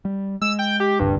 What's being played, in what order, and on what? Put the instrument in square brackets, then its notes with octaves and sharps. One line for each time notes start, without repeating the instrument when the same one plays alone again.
[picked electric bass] G3
[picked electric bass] G#3 [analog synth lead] E6
[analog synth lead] G5
G4
[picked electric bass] D#1 C2 D3 [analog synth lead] G2